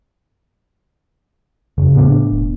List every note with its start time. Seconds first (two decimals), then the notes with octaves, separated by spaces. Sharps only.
1.78 F#1 C#3
1.95 A2 B3 D4
2.32 E1